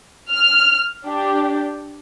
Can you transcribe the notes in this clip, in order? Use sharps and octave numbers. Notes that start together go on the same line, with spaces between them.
F6
D4 G4